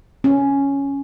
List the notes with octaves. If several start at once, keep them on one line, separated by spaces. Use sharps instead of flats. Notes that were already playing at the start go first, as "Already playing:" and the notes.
C#4